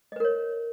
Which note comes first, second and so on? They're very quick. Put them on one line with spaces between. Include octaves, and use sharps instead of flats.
D#5 B4 A#4 C#5